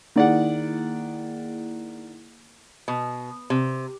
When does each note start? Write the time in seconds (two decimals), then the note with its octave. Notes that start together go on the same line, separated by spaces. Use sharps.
0.16 D#3 A#3 E4 G#4 D5 F#5
2.88 B2
3.50 C3